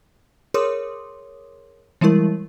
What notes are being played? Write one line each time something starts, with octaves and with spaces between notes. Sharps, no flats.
G#4 A#4 C#5 C6 D6 D#6
E3 G3 G#3 E4 A#4